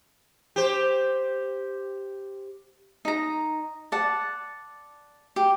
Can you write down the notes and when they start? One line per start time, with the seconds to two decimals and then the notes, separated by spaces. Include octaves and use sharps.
0.56 G4 C5
3.05 D#4 A#5
3.92 D5 F#5 A5
5.36 G4